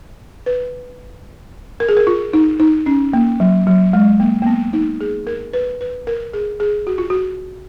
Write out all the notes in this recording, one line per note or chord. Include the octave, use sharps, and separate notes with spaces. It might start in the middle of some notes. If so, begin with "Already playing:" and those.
B4
A#4
G#4
A#4
F4
D#4
D#4
C#4
A#3
F#3
F#3
G#3
A#3
A#3
B3
D#4
G#4
A#4
B4
B4
A#4
G#4
G#4
F#4
F4
F#4